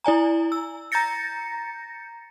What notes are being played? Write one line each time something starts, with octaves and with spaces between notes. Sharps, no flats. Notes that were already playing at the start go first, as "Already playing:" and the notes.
E4 D5 G#5 A#5
E6
A#5 G6 A6 A#6 C#7